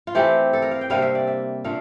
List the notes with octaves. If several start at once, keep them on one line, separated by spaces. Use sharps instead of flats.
F4
E3 A3 C4 G4
A4
A#4
F5
G5
C3 G3 A#3 D4 F5
E5
D5
E5
A#2 A3 D4 F5